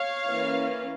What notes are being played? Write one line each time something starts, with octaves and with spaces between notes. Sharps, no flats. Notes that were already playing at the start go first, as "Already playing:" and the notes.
Already playing: C#5 F5
E3 A#3 C#4